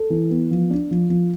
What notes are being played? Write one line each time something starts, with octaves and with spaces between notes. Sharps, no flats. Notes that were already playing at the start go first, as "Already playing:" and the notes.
Already playing: A4
E3
B3
F3
D4
F3
F3